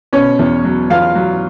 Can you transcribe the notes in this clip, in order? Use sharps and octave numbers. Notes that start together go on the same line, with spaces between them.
B2 C#4 C#5
E2
F#3
E2 F4 F5
F#3